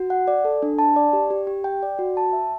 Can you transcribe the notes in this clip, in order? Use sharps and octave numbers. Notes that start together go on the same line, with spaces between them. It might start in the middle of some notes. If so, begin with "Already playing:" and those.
Already playing: F#4
F#5
D5
A4
D4
A5
D5
G4
G4
G4
G5
D5
F#4
A5
E5